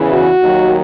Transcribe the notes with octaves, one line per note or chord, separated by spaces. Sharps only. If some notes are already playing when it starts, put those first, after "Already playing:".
Already playing: E2 C#3 E3
F#4
D#2 D#3 F#3